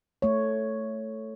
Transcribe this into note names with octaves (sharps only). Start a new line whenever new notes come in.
A3 C#5